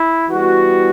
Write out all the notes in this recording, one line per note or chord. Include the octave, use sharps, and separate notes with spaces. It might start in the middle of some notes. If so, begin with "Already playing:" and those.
Already playing: E4
E3 G3 B3 F#4